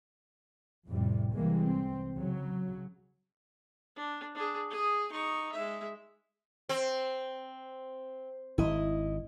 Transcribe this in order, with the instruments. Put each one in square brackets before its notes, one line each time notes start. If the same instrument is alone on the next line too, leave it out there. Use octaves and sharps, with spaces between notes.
[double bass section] F2 A2 C3 G3
C2 C3 E3 G3 G#3 A#3
C4
C#3 F#3
[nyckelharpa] D4
D4 G#4
G#4 D#6
D#4 C#6
G#3 E5
[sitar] C4
[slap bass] G#1 [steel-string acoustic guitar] E4 D#5